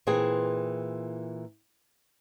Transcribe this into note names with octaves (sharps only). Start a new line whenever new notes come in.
A#2 E3 C4 E4 G#4